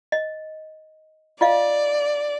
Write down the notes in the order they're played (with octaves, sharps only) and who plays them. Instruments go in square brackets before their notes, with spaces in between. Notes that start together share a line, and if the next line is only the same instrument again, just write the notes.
[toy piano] D#5
[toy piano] F4 D#5 F5 [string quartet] D5